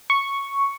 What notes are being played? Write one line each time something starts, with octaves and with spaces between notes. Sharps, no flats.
C#6